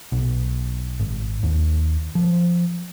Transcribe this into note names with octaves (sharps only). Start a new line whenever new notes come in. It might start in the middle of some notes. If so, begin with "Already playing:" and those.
B1
G#1
D#2
F3